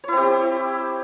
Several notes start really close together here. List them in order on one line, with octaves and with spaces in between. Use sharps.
C#5 E4 C4 G4